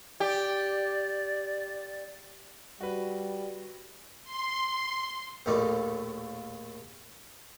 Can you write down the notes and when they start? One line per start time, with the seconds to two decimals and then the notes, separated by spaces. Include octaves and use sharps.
0.20 G4 D5
2.81 G3 F#4 B4
4.24 C6
5.46 A#1 D#2 A2 D#4 F4 D5